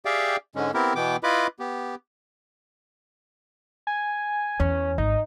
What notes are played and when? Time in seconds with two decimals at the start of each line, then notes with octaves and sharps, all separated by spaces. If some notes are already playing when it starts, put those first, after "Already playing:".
0.05 G4 G#4 D5 E5 F5 G5
0.55 G#2 D3 G#3 C#4
0.74 B3 C4 E4 G4 A#4
0.95 B2 E3 B3 G5 D6
1.23 E4 F4 B4 D#5 B5 D6
1.59 B3 G4
3.87 G#5
4.60 E2 C#4
4.98 G#1 D#4